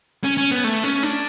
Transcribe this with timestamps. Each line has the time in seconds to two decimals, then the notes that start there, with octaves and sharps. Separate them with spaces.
0.24 C#4
0.37 C#4
0.51 B3
0.64 A3
0.84 C#4
1.03 D4